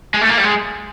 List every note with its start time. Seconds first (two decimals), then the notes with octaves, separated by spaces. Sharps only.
0.14 G#3
0.21 A3
0.29 A#3
0.38 G3
0.43 G#3